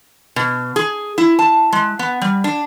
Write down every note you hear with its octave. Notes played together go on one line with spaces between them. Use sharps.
B2
G#4
E4
A5
G#3
B3
G3
D4